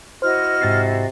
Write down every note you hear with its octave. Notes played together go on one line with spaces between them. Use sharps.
E4 F#4 C5 D#5 F6
G#2 C3 A6 C7